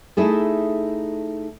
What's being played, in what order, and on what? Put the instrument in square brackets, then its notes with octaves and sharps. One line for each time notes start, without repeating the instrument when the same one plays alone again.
[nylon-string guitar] A3 D#4 E4 G#4 A4